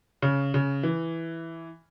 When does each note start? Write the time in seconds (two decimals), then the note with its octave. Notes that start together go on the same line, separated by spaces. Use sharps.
0.22 C#3
0.54 C#3
0.83 E3